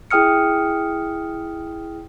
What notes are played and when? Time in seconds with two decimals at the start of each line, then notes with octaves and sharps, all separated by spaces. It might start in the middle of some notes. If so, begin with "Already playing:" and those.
0.11 E4 G#4 G5 D#6 F6 C#7